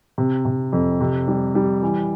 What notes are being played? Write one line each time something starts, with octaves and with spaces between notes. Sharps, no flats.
C3
C3
F2
C3
G3
G3
E3